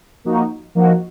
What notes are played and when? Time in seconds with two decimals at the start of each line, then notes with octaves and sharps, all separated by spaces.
0.24 F3 A#3 D#4 F#4
0.75 F3 A#3 D#4 F#4